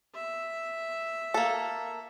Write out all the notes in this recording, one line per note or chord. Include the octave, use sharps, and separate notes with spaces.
E5
A#3 A4